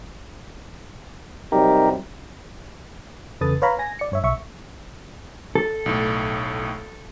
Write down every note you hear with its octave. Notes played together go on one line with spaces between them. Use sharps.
C3 F#3 G3 D#4 G4 A#4
E2 C#3 A4 B4 D#6 A6
B4 C#5 F5 A#5 B5
G#5 A#6
D5 C#7
G2 C#5 E5
B1 E5 C#6
A4
B1 A2